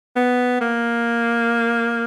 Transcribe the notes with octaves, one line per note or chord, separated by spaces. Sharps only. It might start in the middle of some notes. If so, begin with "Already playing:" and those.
B3
A#3